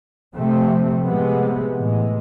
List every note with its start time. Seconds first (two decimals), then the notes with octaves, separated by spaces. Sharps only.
0.35 C3 F3 A3 C4
1.05 C3 G#3 B3
1.74 A2 E3 G#3